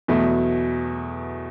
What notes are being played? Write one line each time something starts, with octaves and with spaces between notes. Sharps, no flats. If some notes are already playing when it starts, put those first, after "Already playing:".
E2 B2 F#3 A3